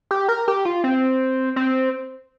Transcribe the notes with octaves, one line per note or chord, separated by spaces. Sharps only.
G4
A#4
G4
F4
C4
C4